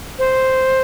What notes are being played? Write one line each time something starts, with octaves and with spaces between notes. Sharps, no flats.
C5